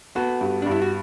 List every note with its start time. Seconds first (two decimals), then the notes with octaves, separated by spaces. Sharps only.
0.16 B3 F#4 A4
0.41 G2
0.62 G2 D4
0.71 E4
0.82 F#4